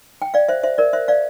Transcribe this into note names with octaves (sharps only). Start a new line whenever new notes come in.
G5
D5 F5
C5 E5
C5 E5
A#4 D5
C5 E5
D5 F5